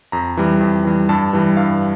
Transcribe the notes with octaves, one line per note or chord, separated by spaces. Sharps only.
F2 A#5
E3 G3
F2
E3 G3
G2 A5
E3 G3
G2 F5